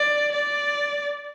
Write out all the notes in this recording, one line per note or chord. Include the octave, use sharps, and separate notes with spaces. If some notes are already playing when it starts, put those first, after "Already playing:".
Already playing: D5
D5